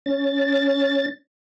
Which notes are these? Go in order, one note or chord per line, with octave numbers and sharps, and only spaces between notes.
C#4 A6